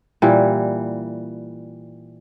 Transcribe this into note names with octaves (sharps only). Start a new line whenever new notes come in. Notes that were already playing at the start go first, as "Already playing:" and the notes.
A#2 E3 G3